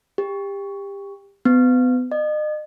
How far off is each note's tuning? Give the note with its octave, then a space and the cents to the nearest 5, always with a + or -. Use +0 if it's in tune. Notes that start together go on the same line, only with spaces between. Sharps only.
G4 +25
B3 +30
D#5 -40